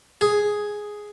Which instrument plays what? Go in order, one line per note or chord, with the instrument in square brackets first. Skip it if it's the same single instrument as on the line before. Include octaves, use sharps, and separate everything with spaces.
[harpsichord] G#4